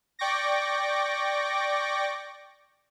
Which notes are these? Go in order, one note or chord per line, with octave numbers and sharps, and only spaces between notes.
D5 G5 C#6 D6 A#6